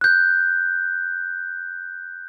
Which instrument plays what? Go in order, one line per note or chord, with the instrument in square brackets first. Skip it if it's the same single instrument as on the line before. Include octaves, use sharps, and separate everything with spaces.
[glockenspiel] F#6 G6